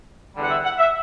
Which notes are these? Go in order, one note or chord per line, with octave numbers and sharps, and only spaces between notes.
E2 D3 G3
F#5
E5
F#5
E5